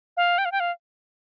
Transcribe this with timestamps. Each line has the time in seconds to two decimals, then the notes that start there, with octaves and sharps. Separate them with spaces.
0.17 F5
0.38 G5
0.45 F5
0.52 G5
0.60 F5